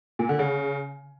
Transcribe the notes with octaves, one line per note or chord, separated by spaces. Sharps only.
A#2
D3
C#3